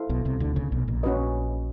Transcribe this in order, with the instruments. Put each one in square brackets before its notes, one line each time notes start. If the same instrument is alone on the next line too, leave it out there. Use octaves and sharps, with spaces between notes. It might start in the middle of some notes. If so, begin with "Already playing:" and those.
Already playing: [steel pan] E4 A4 C5 F5
[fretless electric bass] B1 B2
C2 C3
D2 D3
C#2 C#3
B1 B2
A#1 A#2
[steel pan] C#4 F#4 B4 D#5